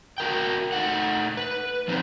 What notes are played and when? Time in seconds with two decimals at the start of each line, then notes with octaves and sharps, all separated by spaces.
0.18 F#4 A#4 G5
0.72 A3 D#4 F#5
1.37 B4
1.88 F3 C4 D#4 C5